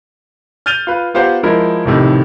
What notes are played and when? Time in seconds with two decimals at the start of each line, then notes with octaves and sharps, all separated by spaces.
0.66 F6 G6 A6 D#7 F7 G7
0.87 F4 B4
1.14 B3 F4 G4 C5 F#5 A#5
1.43 F3 G#3 E4 A#4
1.85 B1 F2 A2 C3 D#3